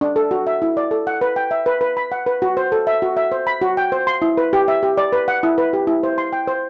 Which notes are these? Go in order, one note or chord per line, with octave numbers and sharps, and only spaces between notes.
D4
A4
F#4
E5
E4
D5
A4
F#5
B4
G5
E5
B4
B4
B5
F#5
B4
F#4
C5
A4
E5
F#4
E5
C5
B5
F#4
G5
C5
C6
E4
B4
G4
E5
G4
D5
B4
F#5
E4
B4
G4
E4
C5
C6
G5
C5